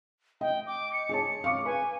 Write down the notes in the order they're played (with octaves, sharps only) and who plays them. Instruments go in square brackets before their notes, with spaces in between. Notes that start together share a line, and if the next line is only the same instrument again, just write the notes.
[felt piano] D#5 [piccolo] G5
[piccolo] D6
C#7
[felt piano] G#4 C#5 A5
F5 C#6 D6
[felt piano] B4 [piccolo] G#5